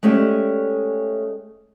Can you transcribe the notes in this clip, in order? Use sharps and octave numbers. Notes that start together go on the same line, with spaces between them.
G#3 A3 C#4 G4 D5